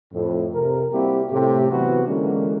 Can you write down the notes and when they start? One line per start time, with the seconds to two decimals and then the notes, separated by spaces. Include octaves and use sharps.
0.13 F2 A2
0.53 C3 A#4
0.92 G3 A#3 C4 E4 F#4 G4
1.30 A2 C3 A3 G4
1.71 C3 E3 F#3 B3 F#4 B4
2.06 D3 E3 G#3 A#3 C#4